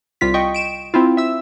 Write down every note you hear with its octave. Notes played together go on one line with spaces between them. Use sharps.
C2 G3 F4 B6
D#5 G5 C#6
D7 E7
C4 E4 F4
E5 E6